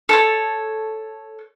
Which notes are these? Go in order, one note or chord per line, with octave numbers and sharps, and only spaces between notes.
A4 C#5